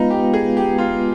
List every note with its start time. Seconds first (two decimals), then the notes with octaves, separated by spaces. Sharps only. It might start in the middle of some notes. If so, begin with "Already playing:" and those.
Already playing: G#3 B3 D#4 F4 B4 F5
0.10 G4
0.34 G#4
0.57 G4
0.78 F4